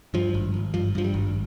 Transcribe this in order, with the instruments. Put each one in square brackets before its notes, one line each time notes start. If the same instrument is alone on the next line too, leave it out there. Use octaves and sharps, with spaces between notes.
[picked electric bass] G2 F3
G#1
G#1
G2 F3
G2 F3
G3
G#1